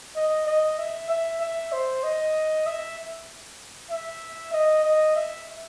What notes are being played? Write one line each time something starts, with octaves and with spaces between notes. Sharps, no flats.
D#5
D#5
E5
E5
E5
C5
D#5
E5
E5
D#5
D#5
E5